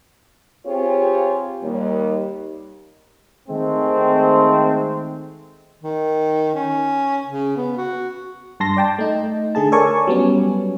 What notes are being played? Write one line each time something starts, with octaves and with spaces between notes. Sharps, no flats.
C4 F4 G4 G#4 C5 C#5
D#2 G3
D#3 G#3 A3 C4
D#3
C#4
C#3
B3
F#4
G2 A5 C6 A#6
D5 G5 A5
A3 D#4
D3 A3 G#4 A5
A4 A#4 C#5 D5 G#5 C#6
F#3 G3 B3 C#4